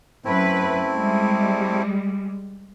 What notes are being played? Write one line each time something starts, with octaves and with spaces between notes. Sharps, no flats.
F#2 A3 C4 E4 B4
G3 G#3